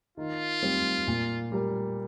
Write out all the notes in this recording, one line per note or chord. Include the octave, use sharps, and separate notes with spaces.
D#3 F4
G3 C4
A#2
G3 A#3